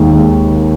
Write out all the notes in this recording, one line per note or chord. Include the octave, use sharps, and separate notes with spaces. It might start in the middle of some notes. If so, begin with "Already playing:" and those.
Already playing: D#2 D#3 G#3